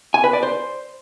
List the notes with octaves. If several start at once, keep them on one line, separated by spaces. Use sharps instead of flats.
G#5
B4
D5
C5